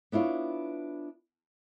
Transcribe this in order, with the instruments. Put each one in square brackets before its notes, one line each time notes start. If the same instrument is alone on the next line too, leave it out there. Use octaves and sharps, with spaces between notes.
[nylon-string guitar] B3 D4 E4 F4 C#5